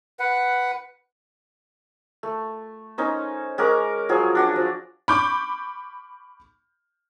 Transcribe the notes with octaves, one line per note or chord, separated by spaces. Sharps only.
B4 F#5
A3
C#4 D#4 C5
G#3 C#4 A#4 D6
F3 F#3 G#4
D4 F#4 D5
F3
B5 C#6 D6 G6